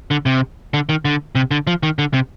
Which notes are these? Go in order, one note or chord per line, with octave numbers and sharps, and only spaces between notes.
D3
C3
D3
D#3
D3
C3
D3
F3
D#3
D3
C3